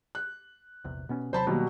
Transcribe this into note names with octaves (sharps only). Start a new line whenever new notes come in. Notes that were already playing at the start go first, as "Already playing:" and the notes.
F#6
A#1 E2 C3
B2 B3 C#4
D#2 C3 F#3 C5 A5 B5
B2 D#3 F#3 G3 A#3